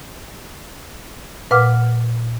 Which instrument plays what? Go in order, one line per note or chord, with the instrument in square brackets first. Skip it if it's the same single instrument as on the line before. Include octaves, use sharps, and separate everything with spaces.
[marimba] A#2 B4 F5 F#5 D6 F6